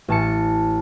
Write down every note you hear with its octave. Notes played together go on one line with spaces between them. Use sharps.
A1 A5 C#7